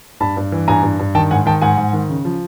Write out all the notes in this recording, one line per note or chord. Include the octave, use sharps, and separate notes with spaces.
G2 A5 B5
G2
E3
G2 G#5 A#5
G2
G2
D#3 G5 A5
G#2 F#5 G#5
D#3 G5 A5
G#2 F#5 G#5
G#2
D#3
C#3
F3